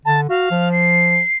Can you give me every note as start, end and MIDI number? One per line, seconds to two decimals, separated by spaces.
0.05 0.25 50
0.05 0.21 81
0.29 0.47 66
0.29 0.71 77
0.51 1.20 53
0.72 1.37 96